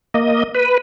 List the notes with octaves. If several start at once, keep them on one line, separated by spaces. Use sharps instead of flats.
A#3 D#5
B4